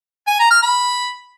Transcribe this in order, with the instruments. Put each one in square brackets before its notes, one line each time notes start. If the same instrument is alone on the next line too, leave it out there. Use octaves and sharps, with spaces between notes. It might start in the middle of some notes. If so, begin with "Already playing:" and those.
[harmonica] G#5
A#5
F6
B5